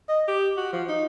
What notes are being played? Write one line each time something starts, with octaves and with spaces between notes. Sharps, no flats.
D#5
G4
F#4
F3
D#4